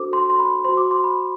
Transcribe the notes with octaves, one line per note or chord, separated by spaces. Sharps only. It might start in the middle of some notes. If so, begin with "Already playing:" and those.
Already playing: D4 F#4 A4 C5 D6
C6
C6
B5
F#4 C5 C6
D6
C6
B5